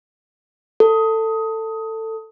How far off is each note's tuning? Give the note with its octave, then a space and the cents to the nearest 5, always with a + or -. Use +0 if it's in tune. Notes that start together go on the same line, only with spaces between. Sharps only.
A4 +20